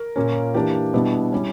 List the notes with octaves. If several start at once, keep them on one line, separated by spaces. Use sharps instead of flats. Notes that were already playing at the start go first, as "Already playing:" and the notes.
Already playing: A#4
A#2 A#3 C#4
E3 A#3 D4 G4
B2 G3 B3 D4 E4
G3 C#4